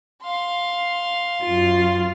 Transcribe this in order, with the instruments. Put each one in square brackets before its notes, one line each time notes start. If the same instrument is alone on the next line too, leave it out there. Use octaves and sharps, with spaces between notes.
[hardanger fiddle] F5 C6
[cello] F#2 F4